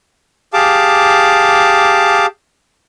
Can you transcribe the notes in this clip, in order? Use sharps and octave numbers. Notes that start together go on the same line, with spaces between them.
G4 G#4 F5 A5 D6